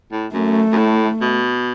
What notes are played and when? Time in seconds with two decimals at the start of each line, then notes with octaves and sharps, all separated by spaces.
0.12 A2
0.34 F#2 A3
0.72 F#2
0.78 A2
1.22 B2